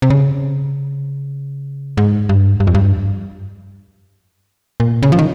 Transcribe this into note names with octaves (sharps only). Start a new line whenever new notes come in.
C3
C#3
G#2
G2
G2
F2
G2
A#2
C#3
F3
D#3